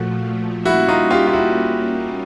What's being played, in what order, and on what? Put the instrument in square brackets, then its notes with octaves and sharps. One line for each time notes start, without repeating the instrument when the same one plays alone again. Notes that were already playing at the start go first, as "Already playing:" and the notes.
Already playing: [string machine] A#2 F3 A3 [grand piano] F#4
[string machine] G3 A#3 C#4 [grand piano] E4 F#4
[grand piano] D#4 F4
F4 G4
F4
E4 F#4